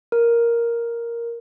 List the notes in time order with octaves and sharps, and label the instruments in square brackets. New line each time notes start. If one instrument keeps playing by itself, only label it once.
[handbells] A#4